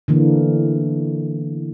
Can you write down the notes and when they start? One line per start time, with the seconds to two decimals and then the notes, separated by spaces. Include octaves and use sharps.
0.08 D3 E3 A#3